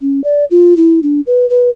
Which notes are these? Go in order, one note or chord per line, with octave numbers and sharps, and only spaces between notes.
C#4
D5
F4
E4
D4
B4
B4